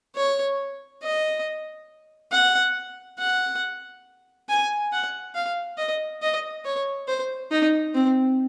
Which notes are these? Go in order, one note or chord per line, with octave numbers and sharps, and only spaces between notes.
C#5
D#5
F#5
F#5
G#5
F#5
F5
D#5
D#5
C#5
C5
D#4
C4